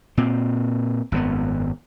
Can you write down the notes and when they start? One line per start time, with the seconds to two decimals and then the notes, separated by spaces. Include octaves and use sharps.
0.17 A#2 C4
1.12 G#1 F#2 D#3 B3